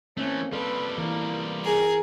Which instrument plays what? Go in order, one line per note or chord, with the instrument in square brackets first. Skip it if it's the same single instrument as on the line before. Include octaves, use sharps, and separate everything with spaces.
[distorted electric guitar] E3 A3 [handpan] A#3 C4 [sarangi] C#4
[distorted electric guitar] G3 F4 [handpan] A4 [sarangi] B4
[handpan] E3 [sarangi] A#3
[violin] G#4 [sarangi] A#4